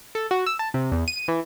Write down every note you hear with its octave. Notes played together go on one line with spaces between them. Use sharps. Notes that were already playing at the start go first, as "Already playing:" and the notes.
A4
F#4
E6
A5
C3
E2
D#7
E3